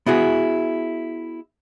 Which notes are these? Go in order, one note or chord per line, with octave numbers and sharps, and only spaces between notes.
B3 E4 F#4 G#4